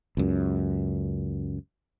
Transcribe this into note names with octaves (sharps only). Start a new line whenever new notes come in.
C#2 F#2